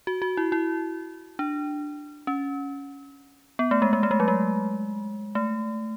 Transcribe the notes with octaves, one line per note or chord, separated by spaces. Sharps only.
F#4
F#4
E4
E4
D4
C#4
B3
A3
G#3
G#3
A3
G#3
F#3
G#3
A3